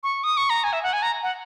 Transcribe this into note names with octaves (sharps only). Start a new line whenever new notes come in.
C#6
D#6
C#6
A#5
G#5
E5
F#5
G#5
A#5
F#5